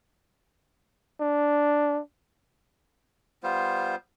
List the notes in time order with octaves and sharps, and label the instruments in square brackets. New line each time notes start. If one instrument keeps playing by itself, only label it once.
[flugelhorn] D4
[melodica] G3 B3 F4 C5